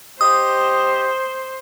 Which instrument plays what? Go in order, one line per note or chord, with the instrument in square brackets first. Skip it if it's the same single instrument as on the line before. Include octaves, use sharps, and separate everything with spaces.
[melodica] G4 D#5 [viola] C5 [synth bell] D#6